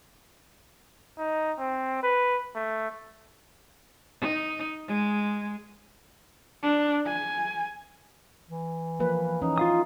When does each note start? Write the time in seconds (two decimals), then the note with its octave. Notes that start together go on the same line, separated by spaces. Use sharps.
1.18 D#4
1.59 C4
2.03 B4
2.56 A3
4.21 D#4
4.88 G#3
6.63 D4
7.07 G#5
8.50 E3
9.00 F3 A#3 B4
9.42 E3 C#4 D#4
9.58 F4 F5 D#6